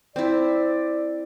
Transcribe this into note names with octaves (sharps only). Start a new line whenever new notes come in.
C4 E4 D5